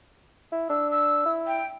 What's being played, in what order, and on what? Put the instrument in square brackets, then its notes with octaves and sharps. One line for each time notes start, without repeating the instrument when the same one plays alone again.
[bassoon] E4
[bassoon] D4 [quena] E6
[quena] E6
[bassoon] E4
[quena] G5